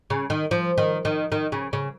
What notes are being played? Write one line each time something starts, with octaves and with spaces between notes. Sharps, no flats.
C#3
D#3
F3
D#3
D#3
D#3
C#3
C#3